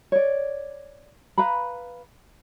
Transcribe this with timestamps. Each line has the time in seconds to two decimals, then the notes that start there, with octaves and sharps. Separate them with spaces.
0.12 C#5 D5
1.38 B4 F5 A#5 B5